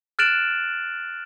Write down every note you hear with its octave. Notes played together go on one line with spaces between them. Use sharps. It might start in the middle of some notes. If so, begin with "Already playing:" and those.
F6 F#6 A6 D7 E7 F#7